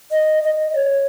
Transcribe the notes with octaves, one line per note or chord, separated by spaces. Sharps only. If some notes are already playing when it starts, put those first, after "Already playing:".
D#5
D#5
D#5
C#5